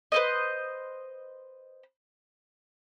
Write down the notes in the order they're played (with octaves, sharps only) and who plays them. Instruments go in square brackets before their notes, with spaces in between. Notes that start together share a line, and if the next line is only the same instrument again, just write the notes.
[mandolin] B4 C5 D#5